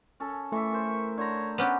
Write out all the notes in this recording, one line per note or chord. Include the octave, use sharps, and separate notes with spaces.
C#4 A4
E3 A3 E5 C#6
A#4 C5
D3 C5 C#5 A#5
B3 C#4 D4 G4